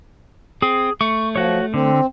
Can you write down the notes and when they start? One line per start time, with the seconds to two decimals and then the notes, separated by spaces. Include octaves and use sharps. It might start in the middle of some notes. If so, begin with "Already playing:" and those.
0.62 C4 G#4
1.01 A3 C#6
1.36 F3 F#4 C#5
1.74 D3 C4